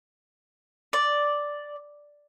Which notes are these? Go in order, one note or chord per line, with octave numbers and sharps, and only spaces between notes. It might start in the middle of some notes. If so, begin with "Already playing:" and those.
D5